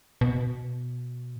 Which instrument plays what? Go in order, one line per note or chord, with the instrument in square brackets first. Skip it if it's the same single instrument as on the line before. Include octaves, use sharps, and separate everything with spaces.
[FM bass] B2